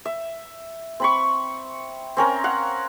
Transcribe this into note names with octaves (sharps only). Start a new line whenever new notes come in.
E5
C4 B5 C#6
C4 C#4 A#4
F5 F#5